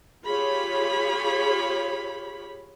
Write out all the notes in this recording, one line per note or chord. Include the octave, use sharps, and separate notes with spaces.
F4 G4 G#4 C#5 B5